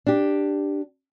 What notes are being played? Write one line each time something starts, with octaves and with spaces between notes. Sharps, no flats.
D4 G4